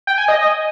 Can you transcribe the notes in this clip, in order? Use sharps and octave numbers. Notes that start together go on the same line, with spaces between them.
G5
G#5
D#5